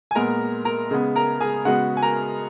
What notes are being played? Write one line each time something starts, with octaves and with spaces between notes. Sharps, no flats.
G#5
A#2 G#3 B3 A#4 A#5
A#4 A#5
C#3 G#3 B3
A#4 A#5
G#4 G#5
C#3 G#3 B3 F#4 F#5
G#5
A#4 A#5